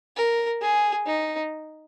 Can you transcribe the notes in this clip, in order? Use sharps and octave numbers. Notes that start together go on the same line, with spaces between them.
A#4
G#4
D#4